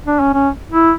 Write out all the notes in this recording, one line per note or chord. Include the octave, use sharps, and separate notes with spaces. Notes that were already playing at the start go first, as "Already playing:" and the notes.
D4
C#4
C#4
E4